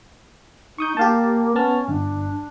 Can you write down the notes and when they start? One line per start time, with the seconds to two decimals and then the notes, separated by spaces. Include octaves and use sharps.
0.78 D#4 C#6 D#6 G6
0.97 A#3 G4 F5 A5
1.56 B3 C#4 A5 F6
1.88 G1 D4